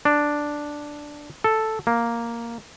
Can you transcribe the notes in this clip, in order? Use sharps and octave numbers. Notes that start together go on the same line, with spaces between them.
D4
A4
A#3